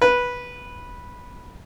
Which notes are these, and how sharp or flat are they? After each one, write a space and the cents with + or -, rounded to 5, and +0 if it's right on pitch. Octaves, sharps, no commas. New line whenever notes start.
B4 -10